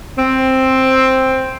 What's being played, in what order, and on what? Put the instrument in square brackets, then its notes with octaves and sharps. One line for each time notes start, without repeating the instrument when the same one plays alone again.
[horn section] C4